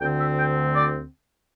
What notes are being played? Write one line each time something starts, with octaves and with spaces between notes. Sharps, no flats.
D2 D3 C4 G5
E5
G5
D5